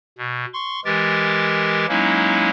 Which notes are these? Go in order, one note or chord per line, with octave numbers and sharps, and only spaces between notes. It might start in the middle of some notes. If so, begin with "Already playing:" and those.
B2
C6 C#6
E3 G#3 G4 A#4 A6
F#3 G#3 A#3 C#4 D#4 E4